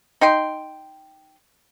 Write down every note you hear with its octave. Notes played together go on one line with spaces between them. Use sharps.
D#4 G5 C6